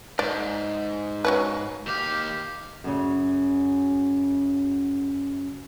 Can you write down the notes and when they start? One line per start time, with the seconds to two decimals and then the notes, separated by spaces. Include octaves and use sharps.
0.19 G#2 D5
1.25 F#3 C#4 B4
1.87 D#2 G4 F5
2.84 F#2 C#3